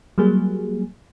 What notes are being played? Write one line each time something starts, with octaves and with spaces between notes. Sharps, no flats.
F#3 G3 A#3 G#4